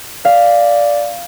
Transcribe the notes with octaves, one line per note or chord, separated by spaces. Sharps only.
D5 F5